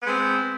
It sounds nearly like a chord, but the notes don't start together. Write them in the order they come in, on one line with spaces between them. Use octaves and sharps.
B3 G#3 C4